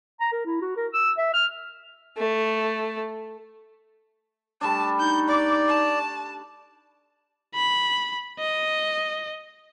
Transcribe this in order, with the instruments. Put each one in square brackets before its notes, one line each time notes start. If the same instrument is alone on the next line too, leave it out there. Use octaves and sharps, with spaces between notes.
[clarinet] A#5
A#4
E4
F#4
A#4
E6
E5
F6
[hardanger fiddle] A3
[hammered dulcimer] G3 A3 D4 [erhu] A5
[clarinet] D#4 [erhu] G6
[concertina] D5 [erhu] D6
[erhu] A5
[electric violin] B5
D#5